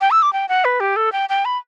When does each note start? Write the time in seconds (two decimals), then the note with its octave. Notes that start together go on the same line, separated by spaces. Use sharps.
0.01 G5
0.11 E6
0.22 D6
0.33 G5
0.49 F#5
0.65 B4
0.80 G4
0.96 A4
1.12 G5
1.29 G5
1.45 B5